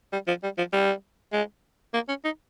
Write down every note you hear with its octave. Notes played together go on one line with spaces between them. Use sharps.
G3
F3
G3
F3
G3
G#3
A#3
C#4
D#4